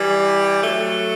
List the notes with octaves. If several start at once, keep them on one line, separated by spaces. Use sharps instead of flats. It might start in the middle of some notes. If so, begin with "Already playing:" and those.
Already playing: E3 G3
F#3 A3